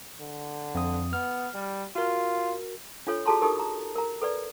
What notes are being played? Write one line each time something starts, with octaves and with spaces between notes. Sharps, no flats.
D3
F2 D#6
B3 F6
G3
F4 F#4 A#4
D4 F4 A4 C#5
F#4 G#4 A4 A5 A#5 C6
D#4 G4 A4 A#4 D#6
A#5
A#4 A#5
A4 B4 D5